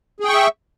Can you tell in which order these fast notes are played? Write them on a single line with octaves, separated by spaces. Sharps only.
G#4 G5 C#6 E5